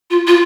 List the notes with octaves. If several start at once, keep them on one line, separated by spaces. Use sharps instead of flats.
F4
F4